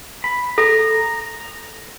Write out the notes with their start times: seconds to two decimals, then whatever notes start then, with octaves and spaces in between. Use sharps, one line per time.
0.24 B5
0.58 A4 A#5